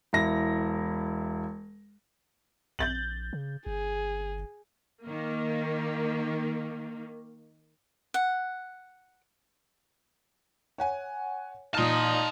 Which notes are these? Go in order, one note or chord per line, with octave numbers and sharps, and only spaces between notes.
E1 E4 A#6
A#1 G6 A6 F#7
C#3
G1 G#4
D#3 A#3
F#5
C#5 F#5 G#5
A#2 D#4 A5 C6 D#6 F6